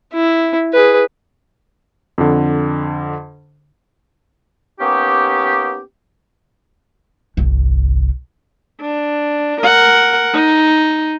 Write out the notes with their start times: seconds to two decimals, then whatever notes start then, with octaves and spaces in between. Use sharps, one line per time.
0.13 E4
0.73 G#4 B4
2.18 F2 D3
4.80 A#3 B3 C#4 D#4 G4
7.37 G1 C2
8.82 D4
9.61 A#4 F#5
10.34 D#4